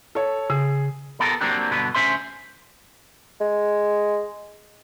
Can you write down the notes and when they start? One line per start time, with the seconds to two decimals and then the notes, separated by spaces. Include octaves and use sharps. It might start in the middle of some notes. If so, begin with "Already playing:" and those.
0.15 A4 C#5
0.50 C#3 G#4
1.20 B3 F4 G4 A4 A#4
1.41 F#3 A#3 C4 D4 G4
1.71 G2 B2 D3 B3 B4
1.95 D2 G#3 C#4 C5 E5 C6
3.40 G#3